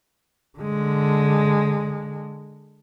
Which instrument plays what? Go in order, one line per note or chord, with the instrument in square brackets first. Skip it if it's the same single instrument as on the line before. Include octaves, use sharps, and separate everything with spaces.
[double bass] D3 G#3